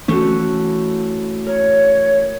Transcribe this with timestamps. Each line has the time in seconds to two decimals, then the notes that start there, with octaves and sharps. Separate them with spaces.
0.08 E3 A3 C#4 F#4 A4 C#5
1.46 A#4 C#5